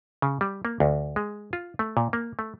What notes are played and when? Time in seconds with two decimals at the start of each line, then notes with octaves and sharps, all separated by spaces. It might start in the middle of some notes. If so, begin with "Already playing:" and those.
0.22 C#3
0.41 G3
0.65 A#3
0.80 D2
1.16 G#3
1.53 F4
1.79 A3
1.97 A#2
2.13 A#3
2.39 A3